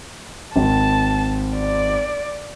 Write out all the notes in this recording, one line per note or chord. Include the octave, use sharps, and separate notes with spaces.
G#1 A5
D5